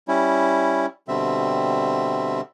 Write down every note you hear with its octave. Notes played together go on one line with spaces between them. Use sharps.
G3 C#4 E4
B2 D3 G3 C4 E5